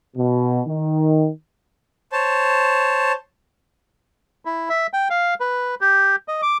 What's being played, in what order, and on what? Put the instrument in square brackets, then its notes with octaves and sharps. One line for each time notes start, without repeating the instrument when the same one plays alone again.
[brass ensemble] B2
D#3
[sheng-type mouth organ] C5 C#5 A5
[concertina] E4
E5
G5
F5
B4
G4
D#5
D6